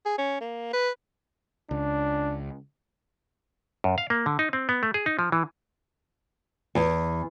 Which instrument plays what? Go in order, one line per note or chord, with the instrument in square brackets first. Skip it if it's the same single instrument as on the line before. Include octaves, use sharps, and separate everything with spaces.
[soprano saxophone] G#4
C#4
A#3
B4
[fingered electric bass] C#2 [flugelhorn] D4
[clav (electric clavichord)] F#2
F5
A#3
D3
D#4
C4
B3
A3
G#4
D#4
F3
E3
[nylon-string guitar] E2